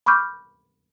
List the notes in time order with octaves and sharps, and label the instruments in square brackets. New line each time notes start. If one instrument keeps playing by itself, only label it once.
[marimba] B5 C#6 D6 F6 G6